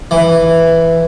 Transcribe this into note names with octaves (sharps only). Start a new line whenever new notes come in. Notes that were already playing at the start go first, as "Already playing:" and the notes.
E3